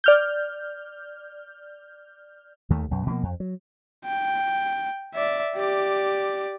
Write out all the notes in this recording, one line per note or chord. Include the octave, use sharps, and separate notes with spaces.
D5 F6 G6
D#2 D#3 A3
B1 F#2
B2 F3 A3 A#3
F2
F#3
G5
D5 E5
G4 D5